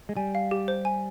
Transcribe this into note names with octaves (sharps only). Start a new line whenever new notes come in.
G#3
G3 G#5
F5
G4
C5
G#5